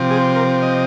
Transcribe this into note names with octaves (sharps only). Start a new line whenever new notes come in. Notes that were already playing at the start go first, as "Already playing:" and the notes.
Already playing: C3 F3 C4
G#4
A#4
D#5